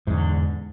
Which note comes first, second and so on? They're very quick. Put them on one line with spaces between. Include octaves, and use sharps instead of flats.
G#2 E2 D3